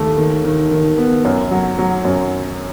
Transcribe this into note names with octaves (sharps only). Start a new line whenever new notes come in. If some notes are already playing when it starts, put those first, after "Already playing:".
Already playing: D#2 A3
D#3
D#3
D#3
B3
F#2
F#3
F#3
F#2